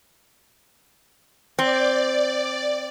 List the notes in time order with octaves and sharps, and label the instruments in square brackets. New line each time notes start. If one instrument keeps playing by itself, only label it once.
[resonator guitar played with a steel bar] C4 [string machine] D5